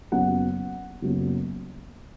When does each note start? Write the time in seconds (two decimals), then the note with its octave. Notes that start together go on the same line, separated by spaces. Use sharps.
0.12 F#1 F#2 C#3 F#3 B3 F#5
1.02 F#1 F#2 C#3 F#3 B3